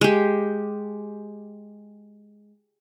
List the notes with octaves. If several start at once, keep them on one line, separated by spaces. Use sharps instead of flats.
G#3 G4